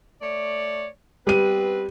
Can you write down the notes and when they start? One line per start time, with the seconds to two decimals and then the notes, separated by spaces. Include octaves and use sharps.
0.22 A3 C#5 D5
1.27 G3 B3 C4 B4 D#7